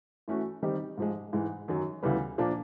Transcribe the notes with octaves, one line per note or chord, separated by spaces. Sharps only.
E3 A3 C#4 F#4
D#3 G3 C4 D#4 G4
G#2 F3 G#3
G#2 E3 G#3
F#2 D#3 F#3
D2 C#3 E3 G3 B3
A#2 F3 A#3 D4